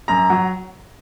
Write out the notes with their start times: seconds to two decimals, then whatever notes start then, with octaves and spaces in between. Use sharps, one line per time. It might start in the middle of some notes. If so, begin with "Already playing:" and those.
0.08 F#2 A#5
0.30 F#3